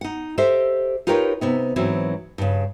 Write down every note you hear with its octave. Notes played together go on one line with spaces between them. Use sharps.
D#4 F#5
G4 A4 C5 D#5 E5
D#4 F4 G4 A#4 B4 C#5
C3 B3 D#4
G#2 E3 F#3 C4
G2 C#3